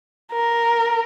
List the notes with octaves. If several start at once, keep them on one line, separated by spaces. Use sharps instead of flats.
A#4